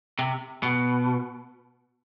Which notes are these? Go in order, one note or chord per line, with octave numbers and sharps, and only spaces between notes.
C3
B2